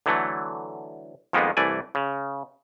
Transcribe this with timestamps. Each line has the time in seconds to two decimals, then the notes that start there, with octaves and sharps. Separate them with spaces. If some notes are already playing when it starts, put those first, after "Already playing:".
0.06 D3 E3 F#3 A3
1.33 F2 D#3 G#3 A#3 B3
1.57 C2 E3 A3 D5 G#5
1.95 C#3